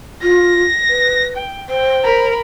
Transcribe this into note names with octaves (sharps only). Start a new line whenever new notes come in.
F4 A#6
B4
G5
C5 G5
A#4 B5